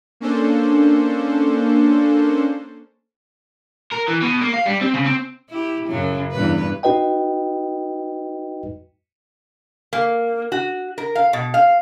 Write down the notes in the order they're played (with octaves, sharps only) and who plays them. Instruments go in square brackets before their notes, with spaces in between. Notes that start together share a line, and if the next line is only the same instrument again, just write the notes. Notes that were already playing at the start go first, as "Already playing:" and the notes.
[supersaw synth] A#3 C#4 D4 A4 C5
[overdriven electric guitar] A#4
E3
B2
A#3
F5
G3
C4
C#3
C4
[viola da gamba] E4 G4
F#2 C#3 F#3
E2 G2 B4
[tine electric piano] D#4 F#4 B4 D#5 G5
[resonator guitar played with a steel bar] A#3
F#4
A#4
F5
B2
F5